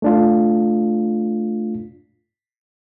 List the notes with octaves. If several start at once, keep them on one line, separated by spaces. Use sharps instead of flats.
A3 D4 F4